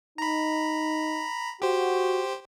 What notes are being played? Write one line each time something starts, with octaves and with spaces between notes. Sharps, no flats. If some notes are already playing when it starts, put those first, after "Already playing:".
D#4 A#5 B5
F#4 G4 C5